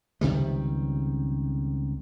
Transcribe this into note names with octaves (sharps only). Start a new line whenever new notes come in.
C#2 C3 D#3 G3